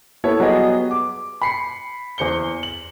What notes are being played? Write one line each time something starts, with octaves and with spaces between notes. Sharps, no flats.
B3 E4 A4 C#5
F#3 G3 B3 F#4 G#4 D#5
D6
B5 C7 C#7
E2 C5 C#7 G7
F#7